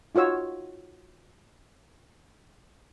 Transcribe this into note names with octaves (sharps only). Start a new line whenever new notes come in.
D#4 F4 F#4 C#5 E6